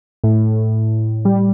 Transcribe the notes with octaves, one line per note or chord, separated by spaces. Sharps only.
A2
G3